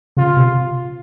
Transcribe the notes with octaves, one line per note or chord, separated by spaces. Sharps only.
C#3 F4
C3